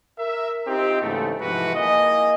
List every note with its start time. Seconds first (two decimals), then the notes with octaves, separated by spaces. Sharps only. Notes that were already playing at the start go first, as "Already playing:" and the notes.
0.18 A#4 E5
0.67 C4 D#4 F4 G4
1.01 G#2 C#3 E3 A3
1.41 G#2 C3 E3 F3 F#4 B4
1.76 A#3 E4 G#4 D#5